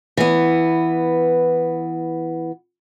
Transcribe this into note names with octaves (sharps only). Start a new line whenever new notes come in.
E3 B3